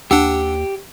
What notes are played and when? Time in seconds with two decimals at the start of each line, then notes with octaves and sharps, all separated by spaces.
0.11 D#2 D4 G4 F#5 E6